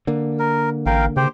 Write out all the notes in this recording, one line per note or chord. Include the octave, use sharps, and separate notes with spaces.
D3 A#3
A#4
A1 A#4 F5 G5
C#3 G4 C5 G5